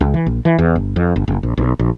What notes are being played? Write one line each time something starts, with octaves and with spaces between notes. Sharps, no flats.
C#2
E3
A#1
E3
E2
G1
F2
G1
F#1
A#1
B1
A#1